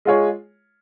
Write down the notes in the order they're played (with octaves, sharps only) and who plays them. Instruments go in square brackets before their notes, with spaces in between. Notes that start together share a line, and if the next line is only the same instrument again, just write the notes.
[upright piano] G#3 F4 G#4 C#5